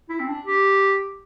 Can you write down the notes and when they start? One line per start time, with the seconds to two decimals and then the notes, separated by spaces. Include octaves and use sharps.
0.09 E4
0.20 C4
0.28 D4
0.45 G4